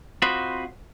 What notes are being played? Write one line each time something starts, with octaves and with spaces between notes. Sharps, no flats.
C4 F4 F#4 C5 D#5 B5